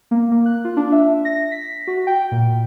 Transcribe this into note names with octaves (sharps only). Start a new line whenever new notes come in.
A#3
A#3
F#6
F4
D4
E5
A#6
B6
F#4
G5
A#2